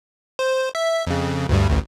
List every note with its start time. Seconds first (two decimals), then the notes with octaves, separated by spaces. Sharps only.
0.39 C5
0.75 E5
1.07 F2 C#3
1.49 D2 G2 G3
1.70 A1 D2